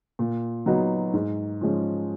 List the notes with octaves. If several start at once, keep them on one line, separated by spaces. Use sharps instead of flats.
A#2
F#3 B3 D#4 F#4
G#2
F3 G#3 C#4